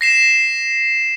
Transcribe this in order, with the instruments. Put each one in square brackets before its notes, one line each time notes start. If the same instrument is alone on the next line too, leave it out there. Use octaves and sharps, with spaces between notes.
[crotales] A#6 C7 E7